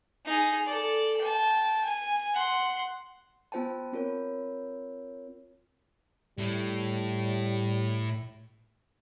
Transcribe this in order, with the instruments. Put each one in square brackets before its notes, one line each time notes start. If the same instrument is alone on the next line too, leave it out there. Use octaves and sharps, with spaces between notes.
[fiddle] D#4 G#4
A4 D5
G5 A5
G#5
F#5 C6
[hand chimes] B3 F4 C5 G5 A5
C4 F4 A#4 C#5
[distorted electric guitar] A2 [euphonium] G3